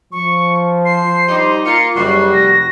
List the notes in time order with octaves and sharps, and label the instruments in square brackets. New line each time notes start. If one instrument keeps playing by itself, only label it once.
[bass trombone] F3 [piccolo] C#6
[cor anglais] C5 [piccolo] C7
[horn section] G3 D#4 G4
[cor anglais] A#3 [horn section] F4 [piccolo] C#7
[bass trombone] F#1 [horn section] G3 [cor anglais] F#4 [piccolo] C7
[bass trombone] F1 [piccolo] A#6